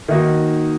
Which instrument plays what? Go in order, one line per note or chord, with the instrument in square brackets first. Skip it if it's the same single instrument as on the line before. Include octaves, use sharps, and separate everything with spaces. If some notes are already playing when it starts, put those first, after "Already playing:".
[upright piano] D#3 A#3 D#4 F#4